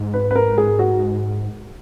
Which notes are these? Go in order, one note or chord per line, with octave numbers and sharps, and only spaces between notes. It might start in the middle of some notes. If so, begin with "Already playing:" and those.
Already playing: G#2
B4
B4
A#4
G#4
F#4